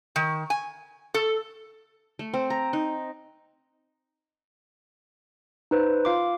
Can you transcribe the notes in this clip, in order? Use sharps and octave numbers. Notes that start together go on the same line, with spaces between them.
D#3
G#5
A4
A3
C4
A#5
D#4
D#4 B4 C5
F4 F5 C6 D6